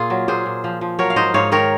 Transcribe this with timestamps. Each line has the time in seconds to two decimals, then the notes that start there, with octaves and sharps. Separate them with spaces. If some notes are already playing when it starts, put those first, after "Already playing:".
Already playing: A#2 F4 G#4
0.10 F#3
0.28 A#2 G#4 C5
0.46 A#2
0.64 F3
0.81 F3
0.99 F#3 A#4 C#5
1.10 F5
1.16 G#2 C5 D#5
1.34 G#2 C#5 F5
1.52 D#3 A#4 C#5